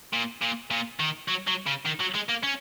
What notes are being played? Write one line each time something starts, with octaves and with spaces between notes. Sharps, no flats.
A#2
A#2
A#2
D#3
F#3
F#3
C#3
D#3
F#3
G#3
A#3
C#4